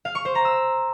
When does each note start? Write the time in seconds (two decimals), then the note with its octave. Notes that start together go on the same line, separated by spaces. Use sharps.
0.05 F5
0.15 C#6
0.25 C5
0.35 A#5
0.45 E6